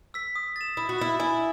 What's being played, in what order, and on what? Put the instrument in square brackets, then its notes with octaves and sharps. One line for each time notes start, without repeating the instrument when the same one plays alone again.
[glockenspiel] E6 B6
D#6
A6 E7
[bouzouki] E4 [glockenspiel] D#6
[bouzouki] F#4
[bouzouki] E4 [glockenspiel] A6 E7
[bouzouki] E4 [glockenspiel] G#5